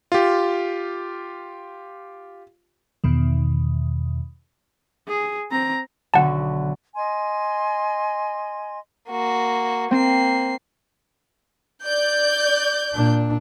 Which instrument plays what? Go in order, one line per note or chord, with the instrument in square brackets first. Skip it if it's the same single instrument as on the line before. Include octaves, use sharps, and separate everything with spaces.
[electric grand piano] F4 G4
[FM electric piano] E2 B2 D#3
[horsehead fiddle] G#4
C4 A#5
[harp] B1 D3 F#4 [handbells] F#5 A5
[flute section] D#5 G#5 C6
[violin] A#3 F#4
[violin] A#3 C7 [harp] C4
[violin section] D5 G6
[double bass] A#2 D4